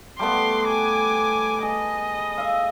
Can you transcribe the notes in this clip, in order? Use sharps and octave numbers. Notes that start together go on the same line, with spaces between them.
G3 A3 B3 C6 D6
G#5 D6
G#4 D#5
E5 F5